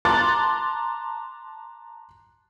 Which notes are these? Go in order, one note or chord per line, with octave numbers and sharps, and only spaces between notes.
A5 A#5 C6 D6 F#6 A6